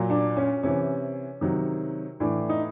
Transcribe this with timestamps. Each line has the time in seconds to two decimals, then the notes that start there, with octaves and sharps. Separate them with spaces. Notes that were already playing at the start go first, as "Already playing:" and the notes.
Already playing: A#2 F#3
0.10 D4
0.37 C#4
0.63 C3 E3 C#4
1.41 C3 D#3 F#3
2.20 A2 E3 D4
2.49 D#4